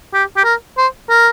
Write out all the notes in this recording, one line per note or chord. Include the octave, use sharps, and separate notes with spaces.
G4
G4
A#4
C5
A#4